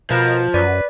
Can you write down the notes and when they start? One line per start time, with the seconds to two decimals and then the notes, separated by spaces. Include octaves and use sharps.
0.10 B2 F3 A#4
0.54 F#2 B4 D5